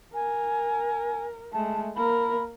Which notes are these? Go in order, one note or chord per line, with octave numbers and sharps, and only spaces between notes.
A#4 G#5
G#3 A3 A5
A#3 A#4 B5